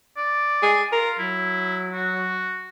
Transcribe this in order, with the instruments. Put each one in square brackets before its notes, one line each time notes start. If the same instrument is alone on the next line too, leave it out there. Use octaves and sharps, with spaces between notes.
[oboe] D5
[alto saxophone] G#4
[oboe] F4 [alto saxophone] A#4
[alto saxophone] F#3 [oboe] E4
[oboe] F#4